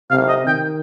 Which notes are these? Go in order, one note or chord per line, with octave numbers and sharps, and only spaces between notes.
C3 F5
D#5
D#3 G5